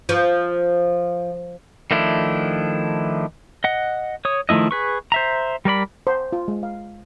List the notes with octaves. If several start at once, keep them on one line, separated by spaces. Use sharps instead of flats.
F3
D#3 F3 A3 D4 E4
D#5 F#5
C#5 D#6
D#3 F3 A3 E4 D#5
G#4 B4 C#6
C5 E5 A#5
G3 A#4 D5 B5
C5
F4
G#3
F5